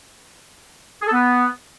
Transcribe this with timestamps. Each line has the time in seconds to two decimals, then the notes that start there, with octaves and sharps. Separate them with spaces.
1.02 G#4
1.07 A4
1.12 B3